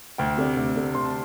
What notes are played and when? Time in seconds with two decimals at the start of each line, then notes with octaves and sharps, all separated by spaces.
0.18 D2 G5
0.38 C3 A3 D4
0.57 D2
0.76 C3 A3 D4
0.95 D2 C6
1.04 A5